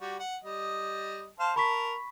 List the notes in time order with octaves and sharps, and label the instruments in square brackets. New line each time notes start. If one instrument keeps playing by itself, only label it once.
[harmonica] G3 F#4
F#5
G3 D#5
C5 F5 A5
[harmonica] A#4 A5 [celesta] B5 C#6 B6